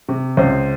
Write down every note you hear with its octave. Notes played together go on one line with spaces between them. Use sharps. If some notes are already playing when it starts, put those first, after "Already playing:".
C3
C#2 C5